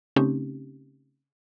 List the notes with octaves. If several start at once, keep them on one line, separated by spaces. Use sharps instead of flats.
C#3 A3 C4 C#4 D#4 G4